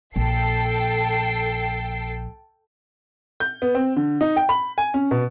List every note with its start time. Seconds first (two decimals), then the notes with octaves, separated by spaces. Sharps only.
0.16 A#1 A4 G5 C7
3.40 G6
3.62 B3
3.75 C4
3.96 D3
4.21 D#4
4.36 G5
4.49 B5
4.78 G#5
4.94 C#4
5.11 B2